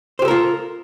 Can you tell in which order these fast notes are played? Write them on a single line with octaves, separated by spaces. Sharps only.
C5 G4 A4 A#4 F4